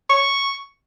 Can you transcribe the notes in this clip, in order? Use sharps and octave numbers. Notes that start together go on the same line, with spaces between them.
C#6